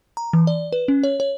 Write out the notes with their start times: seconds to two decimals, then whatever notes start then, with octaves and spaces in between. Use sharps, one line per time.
0.17 A#5
0.33 E3
0.47 D5
0.72 B4
0.88 C#4
1.03 C#5
1.20 C#5